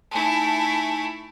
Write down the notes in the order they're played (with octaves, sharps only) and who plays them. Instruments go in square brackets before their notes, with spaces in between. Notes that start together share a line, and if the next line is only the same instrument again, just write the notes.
[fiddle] A3 E4 [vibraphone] D#4 G#5 A5